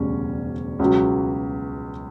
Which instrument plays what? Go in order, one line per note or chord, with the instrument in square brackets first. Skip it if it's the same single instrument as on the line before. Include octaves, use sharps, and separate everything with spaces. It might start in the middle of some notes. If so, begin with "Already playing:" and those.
Already playing: [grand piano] E1 D2 C#3 G3 C#4
C#2 B2 F#3